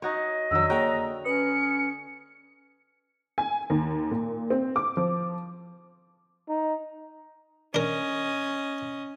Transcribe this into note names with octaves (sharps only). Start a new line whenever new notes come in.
D#4 F#4 C#5 D#5
F2 D3 D#3 F#3 E6
A#3 F#4 G#4 C#5 G5 A#5
C#4 B4 D#6 C#7
G#5
D#2
A#2
C4
D6
F3
D#4
C#4 D4 A#4 D#5